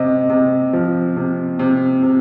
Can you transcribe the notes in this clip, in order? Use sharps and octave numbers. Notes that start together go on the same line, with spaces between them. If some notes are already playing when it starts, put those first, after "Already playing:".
Already playing: C3 C4 D#5
C3
F3
C3
C3
C3